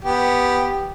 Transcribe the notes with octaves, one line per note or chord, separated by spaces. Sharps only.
B3 G4